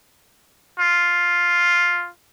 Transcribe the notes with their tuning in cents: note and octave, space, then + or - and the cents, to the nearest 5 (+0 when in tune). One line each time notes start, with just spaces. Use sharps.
F4 +5